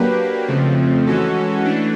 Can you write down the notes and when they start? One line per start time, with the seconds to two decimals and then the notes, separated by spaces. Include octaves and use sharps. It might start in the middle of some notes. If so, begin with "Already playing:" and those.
Already playing: F#3 A#3 D4 G4 B4
0.48 F2 C#3 F3 A3 C4
1.06 E3 G#3 C#4 F#4 A4
1.65 E3 A3 D4